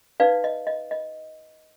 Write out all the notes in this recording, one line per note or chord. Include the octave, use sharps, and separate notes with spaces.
D#4 B4 D5 F5
D#5
D#5
D#5